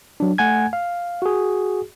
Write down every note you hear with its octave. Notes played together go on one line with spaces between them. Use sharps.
F#3 D4
A3 F#5 G#5 G#6
F5
F#4 G#4